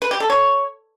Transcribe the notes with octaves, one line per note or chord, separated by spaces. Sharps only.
B4
G4
A4
C#5